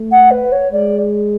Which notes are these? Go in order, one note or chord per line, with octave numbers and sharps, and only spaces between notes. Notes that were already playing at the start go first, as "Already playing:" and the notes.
Already playing: A3
F#5
B4
C#5
G#3 D5